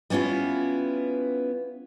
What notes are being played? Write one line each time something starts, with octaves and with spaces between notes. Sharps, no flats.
G3 B3 C#4 E4 F4